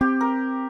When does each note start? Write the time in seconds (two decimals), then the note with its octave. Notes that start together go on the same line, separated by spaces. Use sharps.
0.01 C4 G4
0.21 A#4